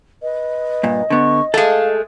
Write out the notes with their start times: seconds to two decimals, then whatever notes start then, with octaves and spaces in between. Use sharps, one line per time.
0.23 B4 D#5
0.83 G2 A#2
1.10 D3 B3 C#6
1.54 G#3 A3 A4 F5